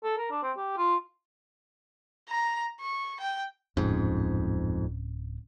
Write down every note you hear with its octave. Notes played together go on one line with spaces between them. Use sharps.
A4
A#4
D4
C4
G4
F4
A#5
C#6
G5
D1 F2 G#2 C#4